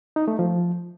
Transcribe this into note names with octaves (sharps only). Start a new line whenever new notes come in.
D#4
A3
F3